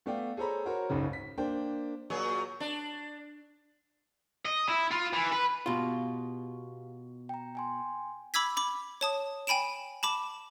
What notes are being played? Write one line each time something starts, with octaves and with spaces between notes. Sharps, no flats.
A3 B3 D5 F5 G5
G#4 A4 C5 C#5 A#5 B5
F#4 A#4 C5 C#5
F#1 C#2 G#2 C#3
B6
A#3 D4 C5 G5
A#2 F#3 G#4
D4
D#5
E4
F4
E3
B4
B2 F4 G4 F5
G5 A#5
G5 G#5 C6
B5 D6 E6 G#6 B6
B5 D6
C#5 A5 D#6
G5 G#5 B5 D7 E7
A5 B5 D6 E7